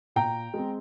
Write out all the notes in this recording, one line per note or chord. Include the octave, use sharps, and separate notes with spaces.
A#2 G5 A#5
G#3 C4